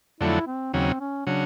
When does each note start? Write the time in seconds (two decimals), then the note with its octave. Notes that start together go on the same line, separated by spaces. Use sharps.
0.20 F2 D3 F#3 A3 E4
0.47 C4
0.74 D#2 C#3 F#3 C4
1.00 C#4
1.26 C#3 F#3 D4